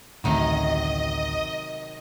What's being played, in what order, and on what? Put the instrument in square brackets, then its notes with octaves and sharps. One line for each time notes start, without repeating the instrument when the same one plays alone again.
[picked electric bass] A1 D2 A3 [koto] C3 D#3 F#3 [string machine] D#5